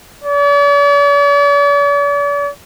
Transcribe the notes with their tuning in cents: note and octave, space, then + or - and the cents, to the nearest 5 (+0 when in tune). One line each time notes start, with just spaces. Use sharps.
D5 -45